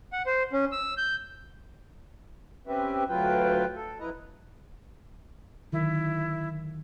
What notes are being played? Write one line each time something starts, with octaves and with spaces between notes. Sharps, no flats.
F#5
C5
C#4
E6
G6
C4 C#4 G4 B4 E5
D2 F#3 F4 B4 G5
A4
F2 E4 B4 D#5 A#5
D3 D#3 F#3 E4